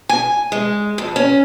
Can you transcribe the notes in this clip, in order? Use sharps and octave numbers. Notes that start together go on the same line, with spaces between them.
G#5
G#3
F2
C#4